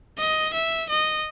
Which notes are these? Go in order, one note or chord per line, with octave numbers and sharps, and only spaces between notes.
D#5
E5
D#5